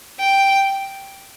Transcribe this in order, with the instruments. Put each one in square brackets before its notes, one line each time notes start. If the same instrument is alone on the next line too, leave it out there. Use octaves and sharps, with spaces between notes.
[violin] G5